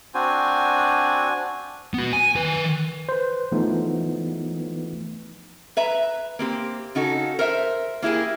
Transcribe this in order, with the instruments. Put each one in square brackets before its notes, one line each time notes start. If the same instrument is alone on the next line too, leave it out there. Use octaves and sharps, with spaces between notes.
[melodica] C4 F#4 C5 [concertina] D4 G#5
[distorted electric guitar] B3 F#4
G#5
D#3 B4
[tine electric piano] B4 C5
E3 F3 A3 B3 D#4
[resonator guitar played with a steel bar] B4 E5 A#5
A#3 C4 G4
C#3 D#4 F#4 A4
A#4 C5 E5
A#3 E4 G4 G#4